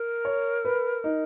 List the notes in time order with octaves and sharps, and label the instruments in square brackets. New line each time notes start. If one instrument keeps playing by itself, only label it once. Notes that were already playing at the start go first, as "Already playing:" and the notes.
Already playing: [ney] A#4
[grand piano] C#5
B4
D#4